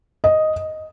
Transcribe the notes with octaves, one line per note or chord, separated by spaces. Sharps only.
D#5